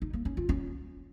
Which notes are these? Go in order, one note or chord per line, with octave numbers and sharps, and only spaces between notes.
D#4
A#3
C#4
F4
C#4